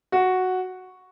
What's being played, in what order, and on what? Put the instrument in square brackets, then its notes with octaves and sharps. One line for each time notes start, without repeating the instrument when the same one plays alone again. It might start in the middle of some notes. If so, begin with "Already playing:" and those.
[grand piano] F#4